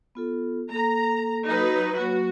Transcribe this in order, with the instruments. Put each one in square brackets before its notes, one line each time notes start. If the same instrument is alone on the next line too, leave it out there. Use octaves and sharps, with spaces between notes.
[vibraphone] B3 F4 A4
[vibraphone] A#3 A4 [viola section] A#5
[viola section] F#3 D#4 B4
[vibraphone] F#3 A#3 [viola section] F#4